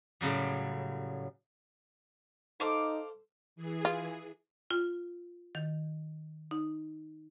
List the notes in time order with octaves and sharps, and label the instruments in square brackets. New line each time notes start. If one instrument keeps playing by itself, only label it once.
[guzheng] A2 C#3 F#3 G3
[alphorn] D#4 [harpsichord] A4 C5 [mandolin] F5 D6
[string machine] E3 G#4
[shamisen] F4
[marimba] F4
D#3
D#4